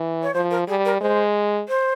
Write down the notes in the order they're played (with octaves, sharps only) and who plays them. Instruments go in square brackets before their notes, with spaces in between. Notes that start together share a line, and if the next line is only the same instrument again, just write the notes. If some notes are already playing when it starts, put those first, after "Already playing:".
Already playing: [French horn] E3
[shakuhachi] C#5
[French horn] F3 [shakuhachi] C5
[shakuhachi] A#4
[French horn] G3 [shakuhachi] G#4
[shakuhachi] A#4
[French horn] G#3 [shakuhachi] C5
[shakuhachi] C5